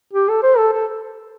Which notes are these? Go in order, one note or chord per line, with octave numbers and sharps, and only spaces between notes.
G4
A4
C5
A4
A4